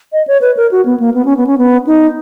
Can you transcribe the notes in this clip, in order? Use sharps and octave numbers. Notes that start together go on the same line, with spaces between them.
D#5
C#5
B4
A#4
F#4
B3
A#3
B3
C#4
B3
C#4
B3
D#4